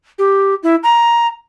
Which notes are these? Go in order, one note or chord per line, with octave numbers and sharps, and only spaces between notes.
G4
E4
A#5